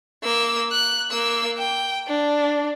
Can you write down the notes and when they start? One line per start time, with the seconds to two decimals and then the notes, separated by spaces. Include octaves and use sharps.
0.23 A#3 E6
0.72 F#6
1.11 A#3 E6
1.58 G5
2.07 D4